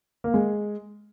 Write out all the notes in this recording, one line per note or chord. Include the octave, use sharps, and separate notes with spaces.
A#3
G#3